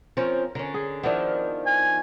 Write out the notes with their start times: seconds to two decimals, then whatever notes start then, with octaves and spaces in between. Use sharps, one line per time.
0.17 F3 C4 C#4 A#4
0.55 D3 C#4 A#4
0.74 G#4
1.03 D#3 F3 B3 D4 E4
1.66 G#5